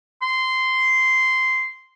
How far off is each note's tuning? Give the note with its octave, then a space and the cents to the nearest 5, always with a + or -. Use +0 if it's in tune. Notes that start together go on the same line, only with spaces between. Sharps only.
C6 -10